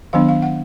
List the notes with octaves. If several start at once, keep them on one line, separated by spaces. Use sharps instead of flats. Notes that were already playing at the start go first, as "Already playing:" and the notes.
D#3 F#3 B3 D4 F5
F5
F#5